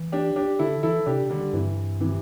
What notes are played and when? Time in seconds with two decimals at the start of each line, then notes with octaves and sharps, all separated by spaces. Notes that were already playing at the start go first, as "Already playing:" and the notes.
Already playing: E3
0.12 D4 G4
0.36 D4 G4
0.59 D3 E4 A4
0.83 E3 E4 A4
1.06 C3 D4 G4
1.30 D3 G3
1.53 G2 C3 E3
2.00 C3 E3